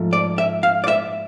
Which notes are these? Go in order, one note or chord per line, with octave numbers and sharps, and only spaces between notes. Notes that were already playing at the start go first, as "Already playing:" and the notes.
Already playing: G#2 F3 A3
D5
E5
F5
D5
E5